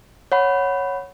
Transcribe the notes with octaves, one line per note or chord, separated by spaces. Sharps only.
C#5 F#5 B5